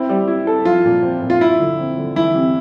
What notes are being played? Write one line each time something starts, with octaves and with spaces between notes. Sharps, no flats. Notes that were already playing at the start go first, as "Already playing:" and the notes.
Already playing: C4 E4
G3
E4
A4
F3 F4
A#2
C4
A#2
F4
F3 E4
D3
C4
D3
E3 E4
C3